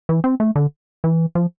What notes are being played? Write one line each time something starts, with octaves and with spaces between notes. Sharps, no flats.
E3
C4
A3
D3
E3
F3